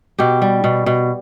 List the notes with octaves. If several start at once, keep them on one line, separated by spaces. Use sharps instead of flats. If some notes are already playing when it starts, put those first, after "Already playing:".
B2 G4
G3
B2
B2